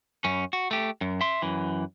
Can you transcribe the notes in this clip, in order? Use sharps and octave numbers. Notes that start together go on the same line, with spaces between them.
F#2 C#4
F#4
A3 G4
F#2
E5 C6
F#2 E3